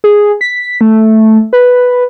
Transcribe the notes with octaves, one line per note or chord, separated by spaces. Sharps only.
G#4
B6
A3
B4